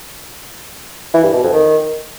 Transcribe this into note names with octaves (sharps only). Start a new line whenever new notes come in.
E3
G2
B2
F2
D#3